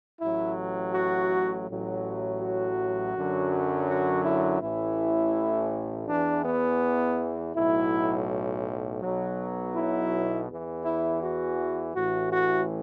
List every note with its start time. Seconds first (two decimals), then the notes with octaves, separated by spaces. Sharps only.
0.21 A1 A2 F#3 E4
0.94 F#4
1.68 A1 A2 F#3
2.41 F#4
3.14 F#2 D3 F#3
3.88 F#4
4.25 E4
4.61 A1 A2 E3 E4
6.08 E2 E3 D4
6.45 B3
7.54 B1 A2 F#3 E4
9.01 B1 B2 F#3
9.74 E4
10.48 E2 E3
10.85 E4
11.22 F#4
11.95 A1 A2 E3 F#4
12.31 F#4